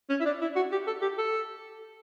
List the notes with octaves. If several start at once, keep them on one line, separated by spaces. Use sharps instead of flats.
C#4
E4
D4
E4
F#4
G4
A4
G4
A4